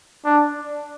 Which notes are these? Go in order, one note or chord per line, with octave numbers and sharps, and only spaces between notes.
D4